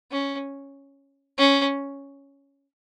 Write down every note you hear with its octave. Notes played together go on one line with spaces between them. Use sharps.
C#4
C#4